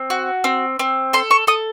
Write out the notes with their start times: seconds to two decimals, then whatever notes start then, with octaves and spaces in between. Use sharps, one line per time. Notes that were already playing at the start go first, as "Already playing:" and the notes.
Already playing: C4
0.10 F#4
0.44 C4
0.79 C4
1.13 A4 C6
1.31 C#6
1.47 A4 D#6